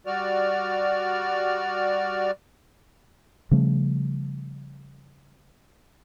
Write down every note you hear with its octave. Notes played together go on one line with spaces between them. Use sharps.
G3 F#4 D5 F6
C#3 F3 G3 A3